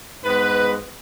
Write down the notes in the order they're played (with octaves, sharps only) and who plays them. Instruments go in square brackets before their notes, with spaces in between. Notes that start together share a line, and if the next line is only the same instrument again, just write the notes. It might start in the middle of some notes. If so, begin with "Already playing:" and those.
[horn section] G#2 G#3 B3 B4